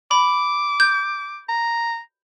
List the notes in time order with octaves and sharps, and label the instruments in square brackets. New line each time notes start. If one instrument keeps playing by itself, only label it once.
[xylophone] B5 [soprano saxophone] D6
[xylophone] G6
[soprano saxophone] A#5